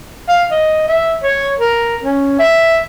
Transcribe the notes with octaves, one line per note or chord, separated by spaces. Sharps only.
F5
D#5
E5
C#5
A#4
C#4
E5